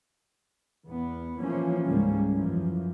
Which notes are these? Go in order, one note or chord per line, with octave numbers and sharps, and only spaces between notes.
E2 B3
E3 F3 A#3 C#4
C#2 G#2 G3 A#3 C#4
F#2 E3 F3